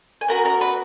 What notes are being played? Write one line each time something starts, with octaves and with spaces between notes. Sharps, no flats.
G#5
B3 F#4 A#4 A#5
A#4 A#5
B4 B5